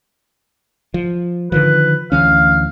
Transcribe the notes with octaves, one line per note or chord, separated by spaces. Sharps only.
F3
D3 D#3 F3 B4
D2 E3 C#4 F5